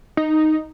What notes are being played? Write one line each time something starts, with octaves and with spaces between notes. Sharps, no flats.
D#4